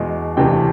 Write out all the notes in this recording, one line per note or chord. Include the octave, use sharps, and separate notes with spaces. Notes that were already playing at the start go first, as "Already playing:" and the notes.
Already playing: E2 B2 G#3
D2 C3 E3 A3 D4 G5